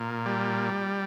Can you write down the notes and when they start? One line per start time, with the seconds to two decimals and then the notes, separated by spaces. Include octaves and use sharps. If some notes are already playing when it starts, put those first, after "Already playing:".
Already playing: A#2
0.26 G3